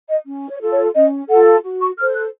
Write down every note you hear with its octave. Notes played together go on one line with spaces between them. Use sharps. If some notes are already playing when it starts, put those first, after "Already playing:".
D#5
C#4
C#5
F4 A4
C#5
C#4 D#5
F4 A4 F#5
F#4
C#6
A4 C5 F6
F#6